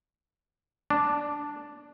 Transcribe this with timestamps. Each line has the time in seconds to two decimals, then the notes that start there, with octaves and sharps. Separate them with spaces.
0.90 D4